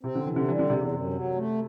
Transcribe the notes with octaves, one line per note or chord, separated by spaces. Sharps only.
C3 C4
D3
C3 E3
D3
E3 G3
D3
E2 C3
C3
F#2
F#3
A3